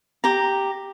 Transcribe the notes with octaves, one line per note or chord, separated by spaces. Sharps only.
G4 A#5